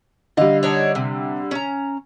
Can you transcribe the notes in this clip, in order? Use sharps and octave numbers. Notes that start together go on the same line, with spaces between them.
D3 G3 D#5 F5
D4 D#4 C#5
C3
C#4 A#5